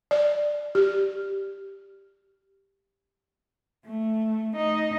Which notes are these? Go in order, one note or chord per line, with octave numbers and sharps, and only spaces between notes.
D5
G4
A3
D#4